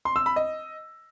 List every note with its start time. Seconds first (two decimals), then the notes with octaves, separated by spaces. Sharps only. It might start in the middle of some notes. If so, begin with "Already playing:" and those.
0.05 C6
0.16 E6
0.26 B5
0.36 D#5